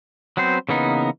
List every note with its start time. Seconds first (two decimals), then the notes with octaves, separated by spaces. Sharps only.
0.37 F#3 B3 C4 C5
0.69 C#3 E3 A#3 B3 D#4